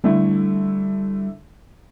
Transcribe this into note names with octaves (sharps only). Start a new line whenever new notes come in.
D3 G3 A3 E4